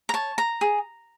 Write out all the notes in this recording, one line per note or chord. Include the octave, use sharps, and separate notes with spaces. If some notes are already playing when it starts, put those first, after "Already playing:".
A#5
C#5 A5
A#5
G#4